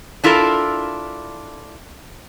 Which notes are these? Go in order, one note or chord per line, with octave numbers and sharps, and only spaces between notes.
D4 E4 F4 A4 A#4